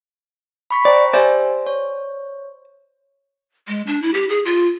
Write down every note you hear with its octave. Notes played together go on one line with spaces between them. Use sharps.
B5 C#6 B6
C5 D5 G5 A#5
G4 C5 D5 E5 G#5
C#5
G#3
D4
E4
G4
G#4
F4